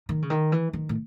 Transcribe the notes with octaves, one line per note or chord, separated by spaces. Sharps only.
D#3
C#3
D#3
E3
D#3
A2